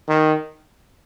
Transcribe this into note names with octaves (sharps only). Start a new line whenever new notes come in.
D#3